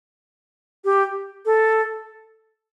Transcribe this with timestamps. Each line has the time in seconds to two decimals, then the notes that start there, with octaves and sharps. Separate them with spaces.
0.85 G4
1.45 A4